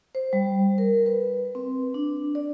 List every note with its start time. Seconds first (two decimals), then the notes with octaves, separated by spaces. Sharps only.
0.15 C5
0.33 G3
0.78 A#4
1.06 B4
1.55 C4
1.94 D4
2.35 D5